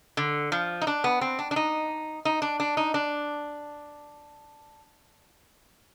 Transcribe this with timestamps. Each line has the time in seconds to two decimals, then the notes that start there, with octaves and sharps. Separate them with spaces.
0.17 D3
0.52 F3
0.81 D#4
0.87 D4
1.04 B3
1.21 C4
1.39 D4
1.51 D4
1.56 D#4
2.25 D#4
2.42 D4
2.60 D4
2.77 D#4
2.94 D4